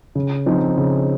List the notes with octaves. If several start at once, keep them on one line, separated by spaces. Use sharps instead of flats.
C#3
F3 C4 D#4
C#3